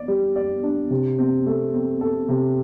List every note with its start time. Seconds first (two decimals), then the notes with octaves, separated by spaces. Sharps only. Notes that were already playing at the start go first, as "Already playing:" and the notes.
Already playing: D5
0.08 G3
0.36 D5
0.63 D4
0.90 C3
1.19 C4
1.46 A3
1.74 C4
2.01 A4
2.29 C3